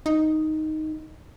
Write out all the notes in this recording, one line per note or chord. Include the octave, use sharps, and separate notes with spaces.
D#4